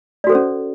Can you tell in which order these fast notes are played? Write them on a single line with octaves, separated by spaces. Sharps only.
D5 F#4 A4 C5 C#4